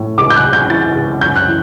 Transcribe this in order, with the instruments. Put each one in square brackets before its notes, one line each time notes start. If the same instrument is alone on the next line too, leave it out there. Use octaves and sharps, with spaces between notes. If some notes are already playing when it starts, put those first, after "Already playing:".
Already playing: [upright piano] A2
C#2 D6
G6
F#6
C#3
G6
E3 A6
C#2
F#2 G6
F#6
E3